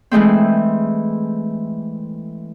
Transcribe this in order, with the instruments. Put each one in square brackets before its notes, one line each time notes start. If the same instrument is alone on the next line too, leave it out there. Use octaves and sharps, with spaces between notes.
[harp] E3 G#3 A3 C4